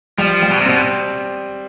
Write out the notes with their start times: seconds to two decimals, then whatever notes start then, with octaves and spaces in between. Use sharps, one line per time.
0.18 F3 G3
0.43 G3
0.50 B2
0.60 C3
0.66 B2 C4